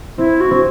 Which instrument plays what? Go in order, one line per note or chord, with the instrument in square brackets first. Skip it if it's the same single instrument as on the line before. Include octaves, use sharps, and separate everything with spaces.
[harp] C4 [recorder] E4
[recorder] F#4
[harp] C4